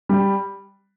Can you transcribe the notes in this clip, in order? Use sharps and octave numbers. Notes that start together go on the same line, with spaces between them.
G3